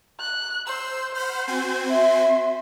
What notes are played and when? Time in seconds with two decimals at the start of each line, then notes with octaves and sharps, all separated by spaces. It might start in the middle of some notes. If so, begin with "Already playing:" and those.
0.20 F#6
0.67 C5 E6
1.15 C5 F#5 B5 F6
1.47 C4 F#4 G#5
1.90 E5 C6